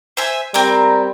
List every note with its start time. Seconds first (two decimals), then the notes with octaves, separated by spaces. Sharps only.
0.17 C5 E5 G#5
0.54 G3 C4 A#4 D6